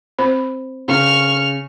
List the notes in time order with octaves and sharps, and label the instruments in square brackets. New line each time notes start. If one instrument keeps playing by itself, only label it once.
[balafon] C4 C5 B5
[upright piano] C#3 [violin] C#6 F6